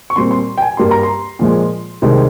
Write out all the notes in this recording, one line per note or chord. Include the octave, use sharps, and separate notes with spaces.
C#6
A#2 G3 C4 C6
C6
G5
G#5
G2 G3 A#3 C6
A#5
C6
A#2 F3 G#3
C2 C3 D#3 G#3 C4